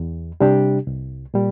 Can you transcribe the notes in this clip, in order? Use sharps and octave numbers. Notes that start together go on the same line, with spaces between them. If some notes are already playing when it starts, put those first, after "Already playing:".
Already playing: E2
C3 G3 D4 G4
C2
A#2 G3